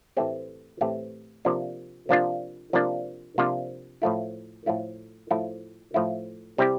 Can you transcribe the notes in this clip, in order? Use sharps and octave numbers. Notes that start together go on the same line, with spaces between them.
A2 E3 A3 C4 G4
A2 E3 A3 C4 G4
C3 F3 A#3 D4 F4
C3 F3 A#3 D4 F4
C3 F3 A#3 D4 F4
C3 F3 A#3 D4 F4
A2 F3 A3 E4
A2 F3 A3 E4
A2 F3 A3 E4
A2 F3 A3 E4
C3 G3 C4 E4 G4